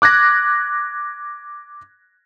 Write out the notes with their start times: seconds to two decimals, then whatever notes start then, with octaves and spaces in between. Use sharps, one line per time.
0.02 D6 F#6 G#6 A#6